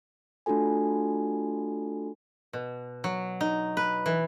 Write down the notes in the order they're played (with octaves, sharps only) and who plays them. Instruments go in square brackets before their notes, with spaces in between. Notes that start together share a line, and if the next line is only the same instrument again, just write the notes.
[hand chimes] A3 D4 F4 F#4 A4 G#5
[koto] B2
F#3
D#4
B4
E3